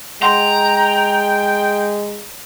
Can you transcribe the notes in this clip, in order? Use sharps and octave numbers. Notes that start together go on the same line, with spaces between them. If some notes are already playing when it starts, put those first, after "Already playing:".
G#3 F#5 G5 A#5 C6